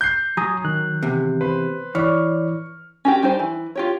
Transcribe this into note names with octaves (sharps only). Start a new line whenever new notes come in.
G6 C7
F#3 G#5 A#5 D#6
D#3 F#6
E2 C3
B4 C5
E3 C#5 D5 C#6 F6
C#4 F#4 G4
G3 D#4 G4 C5
E3
F4 G4 C#5